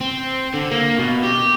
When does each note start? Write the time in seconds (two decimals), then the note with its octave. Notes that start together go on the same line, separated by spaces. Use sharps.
0.01 C4
0.54 D3
0.71 A#3
0.99 B2
1.23 G4